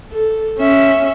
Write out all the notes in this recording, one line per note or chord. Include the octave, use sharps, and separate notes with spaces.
A4
C#4 E5